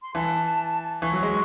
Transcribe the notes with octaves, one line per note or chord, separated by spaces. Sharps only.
C6
E3 A5
E3 C#6
F#3
G#3